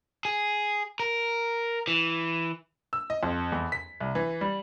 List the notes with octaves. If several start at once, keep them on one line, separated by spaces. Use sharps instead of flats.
G#4
A#4
E3
E6
D#5
F2
E2
B6
C2
E3
G3